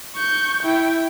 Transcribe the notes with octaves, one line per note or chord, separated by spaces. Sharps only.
C#6 G6
E4 G5